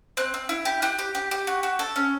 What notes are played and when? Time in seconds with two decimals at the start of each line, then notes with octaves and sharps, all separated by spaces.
0.17 C4 F#6
0.34 C4
0.49 E4
0.65 G4
0.82 G4 F#6
0.99 G4
1.15 G4
1.31 G4
1.47 F#4
1.63 F#4
1.79 A4
1.96 C#4